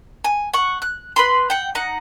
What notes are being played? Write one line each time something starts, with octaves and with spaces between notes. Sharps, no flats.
G#5
F#5 C#6
F#6
B4 B5 C6
F#5 G5
D#4 F#5